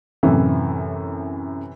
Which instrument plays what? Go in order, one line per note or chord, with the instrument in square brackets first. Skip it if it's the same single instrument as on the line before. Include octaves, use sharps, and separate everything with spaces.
[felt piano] F#2 A2 [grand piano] C3 E3